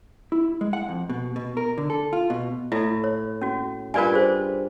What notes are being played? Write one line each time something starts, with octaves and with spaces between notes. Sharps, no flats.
E4
G#3
F#5
F2
B2
B2
A#4
D3
A4
F4
B2
A2 E4
C#5
C#4 F#4
G2 F4 A#4 B4 D5 G#5
G#4 C5